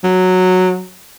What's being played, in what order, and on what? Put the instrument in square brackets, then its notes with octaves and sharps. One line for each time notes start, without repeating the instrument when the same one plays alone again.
[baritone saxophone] F#3